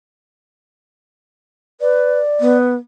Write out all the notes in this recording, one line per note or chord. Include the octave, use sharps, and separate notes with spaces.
B4 D5
B3